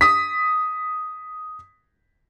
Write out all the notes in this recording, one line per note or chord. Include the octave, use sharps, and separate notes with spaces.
D#6 B6